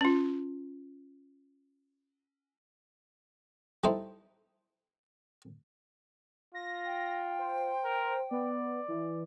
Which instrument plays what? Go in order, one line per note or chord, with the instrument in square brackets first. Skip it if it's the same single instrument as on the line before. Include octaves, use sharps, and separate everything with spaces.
[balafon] C#4 F4
[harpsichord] G3 D#4 E4 A4 C5
[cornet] F4 [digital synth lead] A#6
[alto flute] G5
[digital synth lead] C5
[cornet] A#4
[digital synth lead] B3 [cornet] D5
[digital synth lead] E3